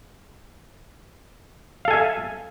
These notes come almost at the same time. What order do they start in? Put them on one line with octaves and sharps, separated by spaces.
F5 A4 G#5 E5